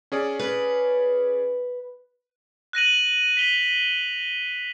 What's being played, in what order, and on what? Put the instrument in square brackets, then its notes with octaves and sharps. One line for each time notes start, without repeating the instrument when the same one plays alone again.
[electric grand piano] C#4 G#4 D5
[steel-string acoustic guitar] B4
[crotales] F#6 A#6 D#7 F#7
B6 F7 G7